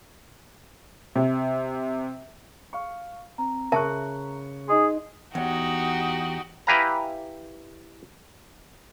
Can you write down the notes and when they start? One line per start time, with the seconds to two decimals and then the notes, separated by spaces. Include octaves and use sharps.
1.16 C3
2.73 F5 C#6
3.38 C4 A#5
3.72 C#3 A#4 E5 A5 C#6 F#6
4.68 D#4 G#4 D#5 C6
5.35 E2 D#4 F#4 G4 F#5
6.67 E4 G4 B4 F5 G#5 A#5